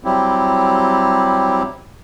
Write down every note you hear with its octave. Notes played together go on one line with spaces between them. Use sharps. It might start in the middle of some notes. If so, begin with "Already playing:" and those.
F#3 G3 C4 E4 G4